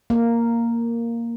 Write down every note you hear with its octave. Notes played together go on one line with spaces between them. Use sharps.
A#3